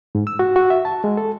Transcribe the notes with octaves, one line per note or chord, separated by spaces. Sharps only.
G#2
E6
F#4
F#4
E5
A5
G#3
A4